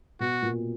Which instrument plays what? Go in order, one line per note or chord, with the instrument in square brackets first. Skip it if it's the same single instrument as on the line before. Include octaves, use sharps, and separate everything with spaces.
[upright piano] B2 [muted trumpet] F#4
[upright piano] A#2